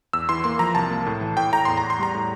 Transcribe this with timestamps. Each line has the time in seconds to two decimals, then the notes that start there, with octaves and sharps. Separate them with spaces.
0.13 E2 E6
0.29 E3 C6
0.44 A#3 C6
0.59 F3 A#5
0.75 C2 A5
0.91 A#3
1.06 A2
1.21 E3
1.37 A2 G5
1.52 A2 A#5
1.65 E2 C6
1.77 A#5
1.83 E2
1.90 C6
1.99 G3 A#5
2.15 A2